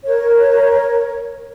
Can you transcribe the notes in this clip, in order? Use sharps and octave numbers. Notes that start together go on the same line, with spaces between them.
A#4 C#5